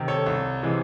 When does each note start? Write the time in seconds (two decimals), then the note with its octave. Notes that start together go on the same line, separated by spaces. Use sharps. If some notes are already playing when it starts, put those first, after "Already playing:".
Already playing: C3 D#3
0.08 A4 C#5
0.26 C2
0.63 C3 E3 G#3